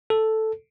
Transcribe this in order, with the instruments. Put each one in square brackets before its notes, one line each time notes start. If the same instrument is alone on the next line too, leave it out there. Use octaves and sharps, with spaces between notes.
[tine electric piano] A4